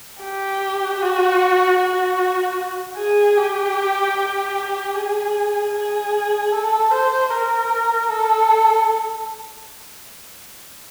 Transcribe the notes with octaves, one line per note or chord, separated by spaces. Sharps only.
G4
F#4
F#4
G#4
G4
G#4
G#4
A4
C5
A#4
A4